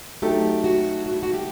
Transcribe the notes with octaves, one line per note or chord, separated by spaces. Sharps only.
F#3 A3 D#4 G4 A4
F#4
F#4
E4
F#4
G4